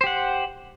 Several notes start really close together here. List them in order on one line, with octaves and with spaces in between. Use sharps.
C5 G4 F#5